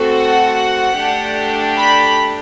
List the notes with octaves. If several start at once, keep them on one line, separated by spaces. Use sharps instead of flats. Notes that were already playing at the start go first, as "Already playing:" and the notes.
Already playing: A3 C4 F#4 A4
F#5
A3 D4 G4
B5